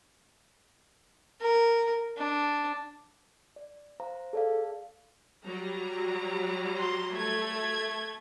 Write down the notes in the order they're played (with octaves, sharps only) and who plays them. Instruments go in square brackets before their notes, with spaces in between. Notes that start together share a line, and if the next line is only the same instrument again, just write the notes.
[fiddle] A#4
D4
[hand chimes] D5
C5 F5 A#5
[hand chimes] G#4 D5 F5 [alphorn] A4
[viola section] F#3 G3 A#5
[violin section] C6
A3 G#6